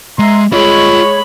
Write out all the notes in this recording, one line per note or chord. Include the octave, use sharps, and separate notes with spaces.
G#3 E5 A#5 C6
G#3 F4 C#5 D#5 B5